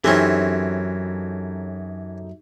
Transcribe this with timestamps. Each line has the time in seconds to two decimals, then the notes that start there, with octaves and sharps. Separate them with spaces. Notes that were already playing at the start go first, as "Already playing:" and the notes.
0.04 F#2 E3 C4 C#4 D#4 G4 A4